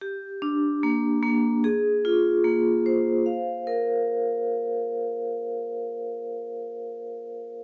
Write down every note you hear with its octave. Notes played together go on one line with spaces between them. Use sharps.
G4
D4
A#3
A#3
G#4
F4
A#3
C5
F5
A#4